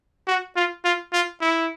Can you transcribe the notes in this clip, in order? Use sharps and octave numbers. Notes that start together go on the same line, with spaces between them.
F#4
F4
F4
F4
E4